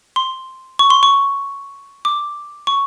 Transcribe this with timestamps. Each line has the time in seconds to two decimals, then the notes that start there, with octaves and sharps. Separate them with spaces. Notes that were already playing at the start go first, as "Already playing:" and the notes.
0.16 C6
0.79 C#6
0.90 C6
1.03 C#6
2.05 D6
2.67 C#6